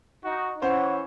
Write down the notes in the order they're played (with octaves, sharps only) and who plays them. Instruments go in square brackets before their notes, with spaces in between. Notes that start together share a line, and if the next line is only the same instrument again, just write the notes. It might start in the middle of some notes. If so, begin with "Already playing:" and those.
[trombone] D#4 [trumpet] F#4
[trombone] E3 [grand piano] C#4 C5 [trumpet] C#5 [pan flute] F#5